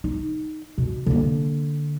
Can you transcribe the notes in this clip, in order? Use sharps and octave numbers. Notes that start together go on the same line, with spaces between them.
D#4
B2
D3 A#3